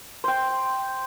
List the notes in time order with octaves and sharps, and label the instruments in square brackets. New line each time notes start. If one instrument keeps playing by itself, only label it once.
[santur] C5 G5